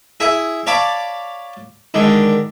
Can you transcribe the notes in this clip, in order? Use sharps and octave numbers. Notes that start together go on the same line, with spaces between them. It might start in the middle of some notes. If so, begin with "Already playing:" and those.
E4 G#4 E5
C#5 D5 F5 A5 B5 D6
D3 D#3 G#3